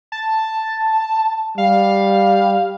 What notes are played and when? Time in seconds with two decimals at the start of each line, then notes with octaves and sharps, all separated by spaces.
0.12 A5
1.58 G3 F5